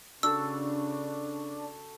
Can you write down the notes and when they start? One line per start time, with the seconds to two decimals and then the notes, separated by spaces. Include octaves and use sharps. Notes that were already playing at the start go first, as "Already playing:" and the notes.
0.23 C#3 D4 F#4 A4 E6